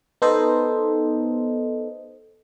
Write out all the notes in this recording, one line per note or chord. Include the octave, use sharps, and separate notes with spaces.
B3 D#4 A4 C5 D#5